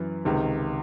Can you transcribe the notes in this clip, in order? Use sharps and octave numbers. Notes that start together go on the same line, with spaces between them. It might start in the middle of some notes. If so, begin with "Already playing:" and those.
Already playing: F#2 E3
C#2 C3 D#3